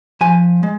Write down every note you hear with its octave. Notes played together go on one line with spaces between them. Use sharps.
F3 G#5
G#3